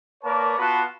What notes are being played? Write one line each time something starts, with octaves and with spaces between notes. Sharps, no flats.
A#3 A#4 B4 C#5 D5 A5
B3 F4 F#4 B4 F#5 A5